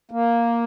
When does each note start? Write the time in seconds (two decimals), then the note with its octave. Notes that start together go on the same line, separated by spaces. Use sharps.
0.11 A#3